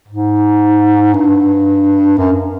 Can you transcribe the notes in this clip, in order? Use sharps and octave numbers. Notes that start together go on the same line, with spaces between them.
G#2
G2
F#2